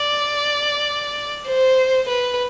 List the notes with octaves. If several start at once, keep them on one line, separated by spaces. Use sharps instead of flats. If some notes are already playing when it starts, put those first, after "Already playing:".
Already playing: D5
C5
B4